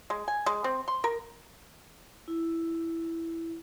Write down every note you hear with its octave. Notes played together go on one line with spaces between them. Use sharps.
G#3
G#5
G#3
C4
C6
A#4
E4